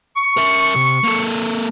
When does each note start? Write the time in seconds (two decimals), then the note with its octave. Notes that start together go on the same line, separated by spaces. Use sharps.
0.16 C#6
0.37 A#4 E5
0.76 C3
1.04 A#3 A4